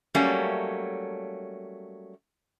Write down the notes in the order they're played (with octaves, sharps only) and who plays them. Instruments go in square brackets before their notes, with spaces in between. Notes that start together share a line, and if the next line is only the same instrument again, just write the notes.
[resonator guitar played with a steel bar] F#3 G3 A3 A#3 C#4